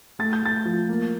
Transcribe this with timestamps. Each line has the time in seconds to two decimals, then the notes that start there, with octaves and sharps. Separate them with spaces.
0.19 A3 A6
0.33 G6
0.42 A3 A6
0.65 F3
0.89 A#3